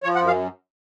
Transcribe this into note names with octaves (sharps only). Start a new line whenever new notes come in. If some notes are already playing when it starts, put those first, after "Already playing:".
F3 C#5
F#5
F#2
F5